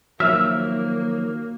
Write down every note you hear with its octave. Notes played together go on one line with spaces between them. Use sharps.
D#3 F3 F#3 A#3 E5 F6